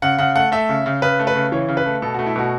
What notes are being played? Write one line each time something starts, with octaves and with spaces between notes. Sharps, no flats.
C#3 F#5
C#3 F#5
A3 F#5
A3 E5
C#3
C#3
C#3 B4
A3
B4
C#3
E3 C#5
C#3
B4
A3
B2 A4
A3 F#4
E4
B2 F#4